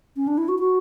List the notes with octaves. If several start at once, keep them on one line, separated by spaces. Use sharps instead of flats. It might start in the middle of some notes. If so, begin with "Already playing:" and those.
C#4
D4
E4
F#4
F#4